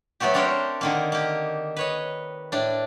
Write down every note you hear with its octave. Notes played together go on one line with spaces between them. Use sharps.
F#3 A3 B3 F#4 G4
C4 D4 G4 A#4 C5 C#5
D3 D#3 A#3
A#3 G4
B4 C#5 D#5
A2 D4